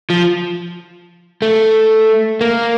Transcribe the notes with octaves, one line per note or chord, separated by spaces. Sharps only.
F3
A3
A#3